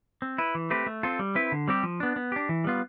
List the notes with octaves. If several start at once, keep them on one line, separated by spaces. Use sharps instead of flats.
C4
E4 B4
E3
A3 C4 G4 B4
A3
C4 F4 A4
G3
C4 E4 B4
D3
G3 C4 G4
F3
B3 D4
B3
D4 G4
E3
G3 B3 F4